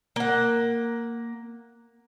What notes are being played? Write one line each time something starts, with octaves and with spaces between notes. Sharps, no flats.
A#3 F#5